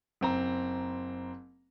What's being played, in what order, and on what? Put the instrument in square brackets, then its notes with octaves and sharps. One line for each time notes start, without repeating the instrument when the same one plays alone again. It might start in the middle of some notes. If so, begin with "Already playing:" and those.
[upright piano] F#1 C4 A#5